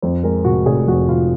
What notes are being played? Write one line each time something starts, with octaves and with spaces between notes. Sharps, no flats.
F2 C5
G#3 A#4
F1 F#4
F1 G#4
F2 F#4
F1 F4